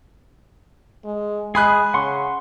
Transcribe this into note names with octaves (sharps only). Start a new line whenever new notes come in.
G#3
G#3 G#4 G#5 B5 D#6 F#6
C#3 F#5 C6 C#6